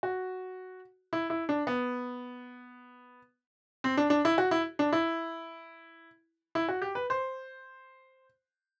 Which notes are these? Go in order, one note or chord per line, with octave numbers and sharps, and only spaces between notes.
F#4
E4
E4
D4
B3
C4
D4
D4
E4
F#4
E4
D4
E4
E4
F#4
G4
B4
C5